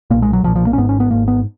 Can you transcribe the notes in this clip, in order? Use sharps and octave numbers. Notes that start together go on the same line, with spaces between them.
B1 A#2 A#3
G#3
F#3
B1 A#2 F3
F3
A#3
C#4
G#1 G#2 B3
C#4
B3
G#1 G#2 A#3
B3